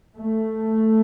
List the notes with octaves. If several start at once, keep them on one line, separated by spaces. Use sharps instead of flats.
A3